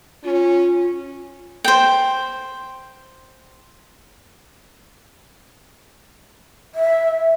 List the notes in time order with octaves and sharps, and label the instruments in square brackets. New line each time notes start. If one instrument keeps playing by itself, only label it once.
[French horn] C#4 [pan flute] F4
[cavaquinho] C5 G5
[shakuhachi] E5